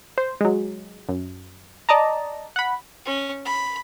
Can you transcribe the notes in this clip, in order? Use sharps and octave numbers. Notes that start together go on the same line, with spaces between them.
C5
F#3 G#3
F#2
D5 D#5 A5 A#5
F#5 B5
C#4
B5